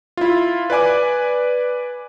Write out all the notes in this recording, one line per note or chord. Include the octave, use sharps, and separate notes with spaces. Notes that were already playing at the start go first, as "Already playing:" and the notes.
E4 F4
B4 D5 G#5 D6